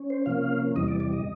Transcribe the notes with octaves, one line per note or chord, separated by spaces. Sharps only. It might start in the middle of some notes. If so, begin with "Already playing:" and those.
Already playing: C#4
C5
C3 F3 A#3 C#4 F5
E2 C3 E3 G3 D#5
D5
D5
D#5